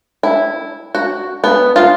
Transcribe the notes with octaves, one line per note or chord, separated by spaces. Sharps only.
E4
F#4
B3
F4